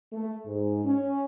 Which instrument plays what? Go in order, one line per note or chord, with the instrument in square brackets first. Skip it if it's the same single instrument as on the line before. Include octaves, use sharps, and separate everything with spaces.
[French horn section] A3
G#2
C#4